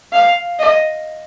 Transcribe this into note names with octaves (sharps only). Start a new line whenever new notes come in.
F5
D#5